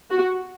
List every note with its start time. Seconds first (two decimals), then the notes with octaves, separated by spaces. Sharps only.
0.10 F#4